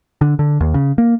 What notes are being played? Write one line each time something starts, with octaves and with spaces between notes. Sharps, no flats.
D3
D3
D#2
C#3
A#3